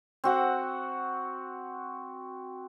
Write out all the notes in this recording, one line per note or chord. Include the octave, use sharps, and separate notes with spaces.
C4 F#4 F#5